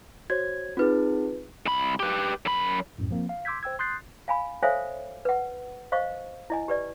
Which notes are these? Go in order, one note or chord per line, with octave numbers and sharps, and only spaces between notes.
F#4 C5 C#5 G#6
C4 D#4 F4 G#4 B4
C2 B5
G4 B4
F#2 B5
C2 F#2 A2
F3 A#3 C4
F5
C6 D6 E6 G6 G#6 B6
C5 G5 E6 G#6
C6 D#6 F#6 G6 A6 C7
F5 G#5 B5
A4 C5 C#5 E5 F5 G#5
B4 F#5
C5 D#5 F5 C#6
E4 D#5 G#5
G4 B4 D5